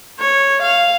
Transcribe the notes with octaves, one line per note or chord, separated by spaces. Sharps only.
C#5
F5